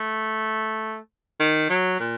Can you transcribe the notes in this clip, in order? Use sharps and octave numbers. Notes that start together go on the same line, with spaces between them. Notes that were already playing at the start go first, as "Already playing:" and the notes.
Already playing: A3
D#3
F#3
A#2